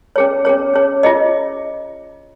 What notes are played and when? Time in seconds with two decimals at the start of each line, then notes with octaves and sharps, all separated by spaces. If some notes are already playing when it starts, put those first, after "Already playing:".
0.16 C#4 G#4 C#5
0.45 C#4 G#4 C#5
0.74 C#4 G#4 C#5
1.03 F4 G#4 D#5